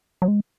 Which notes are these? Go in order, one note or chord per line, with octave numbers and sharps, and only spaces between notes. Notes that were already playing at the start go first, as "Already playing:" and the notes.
F#3
G#3